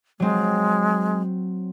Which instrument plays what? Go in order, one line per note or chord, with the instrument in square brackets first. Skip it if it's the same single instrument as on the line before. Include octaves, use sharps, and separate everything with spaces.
[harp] F#3 C4 [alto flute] G#3